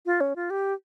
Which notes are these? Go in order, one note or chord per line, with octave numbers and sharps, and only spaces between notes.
F4
C#4
F4
G4